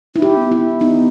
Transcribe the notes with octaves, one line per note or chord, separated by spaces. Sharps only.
D#4 E4
G4
B3
E4
B3 D#4